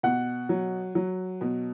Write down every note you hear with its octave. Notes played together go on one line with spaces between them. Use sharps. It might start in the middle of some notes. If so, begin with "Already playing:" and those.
B2 F#5
F#3
F#3
B2